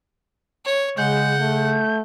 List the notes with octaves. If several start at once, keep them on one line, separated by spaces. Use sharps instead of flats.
C#5
C#3 G#3 F#5 G6
A3